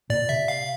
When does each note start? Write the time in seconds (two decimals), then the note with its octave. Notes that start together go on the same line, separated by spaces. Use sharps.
0.10 A#2 D5
0.29 C3 E5
0.48 F5